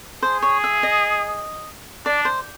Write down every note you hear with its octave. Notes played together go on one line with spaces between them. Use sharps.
G#4 C5
C#5
E5
D#5
D4 D5
C5